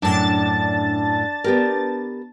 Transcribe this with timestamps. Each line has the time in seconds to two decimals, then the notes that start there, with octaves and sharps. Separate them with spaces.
0.02 F#2 A2 D4 A5 A6
1.44 B3 G4 A#4